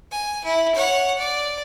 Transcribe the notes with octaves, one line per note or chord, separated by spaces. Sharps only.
G#5
E4
C#5 F#5
D5